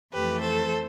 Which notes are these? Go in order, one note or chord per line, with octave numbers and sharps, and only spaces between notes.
F2 E3 A3 G4 B4
A4 C5